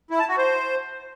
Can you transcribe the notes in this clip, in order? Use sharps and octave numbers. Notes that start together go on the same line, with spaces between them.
E4
A5
F#4
C5